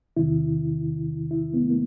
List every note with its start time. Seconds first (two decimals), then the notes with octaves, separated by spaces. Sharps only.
0.17 E2 C3 D#3 E4
1.31 E4
1.54 B3
1.62 A3
1.69 A#3